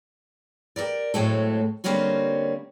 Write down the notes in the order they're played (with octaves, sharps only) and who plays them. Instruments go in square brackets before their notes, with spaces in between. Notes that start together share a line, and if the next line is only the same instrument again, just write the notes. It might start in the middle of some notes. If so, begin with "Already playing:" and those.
[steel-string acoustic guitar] G4 A4 A#4 D5
A2 F#3 G#3 A3 C4 A4
D3 G3 A#3 C4 C#4 F#4